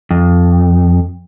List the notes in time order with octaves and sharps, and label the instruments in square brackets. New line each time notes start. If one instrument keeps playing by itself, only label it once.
[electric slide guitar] F2